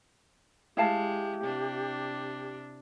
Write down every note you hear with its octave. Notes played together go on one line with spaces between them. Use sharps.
G#3 E4 G4 F5 A5
C3 D4